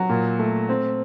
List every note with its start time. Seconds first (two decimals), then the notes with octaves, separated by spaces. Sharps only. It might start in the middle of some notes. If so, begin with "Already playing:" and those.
Already playing: F#3
0.09 A#2
0.39 A3
0.69 C4